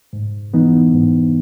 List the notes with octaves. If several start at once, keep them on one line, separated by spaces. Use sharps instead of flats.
G#2
E3 B3 D#4
G#2